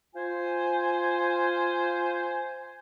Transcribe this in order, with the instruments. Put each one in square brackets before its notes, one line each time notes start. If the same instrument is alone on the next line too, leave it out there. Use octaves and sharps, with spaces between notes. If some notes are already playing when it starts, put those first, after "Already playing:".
[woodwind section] F4 C5 G#5